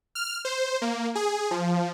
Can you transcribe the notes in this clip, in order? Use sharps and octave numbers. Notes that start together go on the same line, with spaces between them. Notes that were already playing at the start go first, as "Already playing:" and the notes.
F6
C5
A#3
G#4
F3